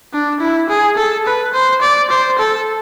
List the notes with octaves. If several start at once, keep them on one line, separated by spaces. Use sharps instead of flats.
D4
E4
G#4
A4
B4
C5
D5
C5
A4